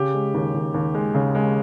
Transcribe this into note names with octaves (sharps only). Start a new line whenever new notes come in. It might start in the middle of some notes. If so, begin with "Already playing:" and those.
Already playing: C#3 G4
G#3
D#2
D#2
D#2
G#3
C#3
G#3